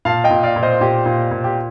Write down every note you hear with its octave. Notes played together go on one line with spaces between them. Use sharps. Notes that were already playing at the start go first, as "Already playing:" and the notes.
A#2 F5 A5
D#5 G5
A#2
D5 F5
A#2
C5 D#5
A#2 G4
A#2
A#2
G4